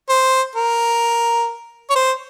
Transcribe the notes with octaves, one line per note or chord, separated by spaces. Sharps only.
C5
A#4
C#5
C5